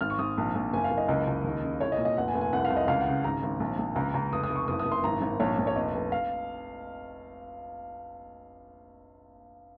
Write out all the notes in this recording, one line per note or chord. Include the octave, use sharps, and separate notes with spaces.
G#1 F6
C#6
G#1 D#6
A#1
A#1
F#1 G#5
F5
F#1
D#5
C#2 D#5
C#2
D#2
C#3
C2 C#5
D#5
A#2
D#5
F1 F#5
G#5
F1
G#5
C2 F#5
F5
C2
D#5
C#2 F5
F#5
C#3
G#1 A#5
G#1
A#1
A#1
C#2 A#5
C#2 A#5
F1 D#6
D#6
F1
C#6
F#1 D#6
D#6
F#1
C6
G#1 A#5
G#1
A#1 C#5
A#1
C#5
F1 D#5
F1
F5